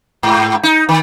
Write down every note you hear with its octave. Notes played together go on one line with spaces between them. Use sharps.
G#2
D#4
D#3